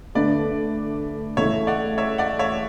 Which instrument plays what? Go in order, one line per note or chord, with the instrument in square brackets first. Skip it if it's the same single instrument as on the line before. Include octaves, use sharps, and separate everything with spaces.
[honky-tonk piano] D3 A3 D4 [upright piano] B4 D5
[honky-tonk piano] C#3 E3 A3 [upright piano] C#5 E5
[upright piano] D5 F#5
C#5 E5
D5 F#5
C#5 E5